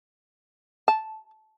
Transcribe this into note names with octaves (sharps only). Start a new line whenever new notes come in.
A5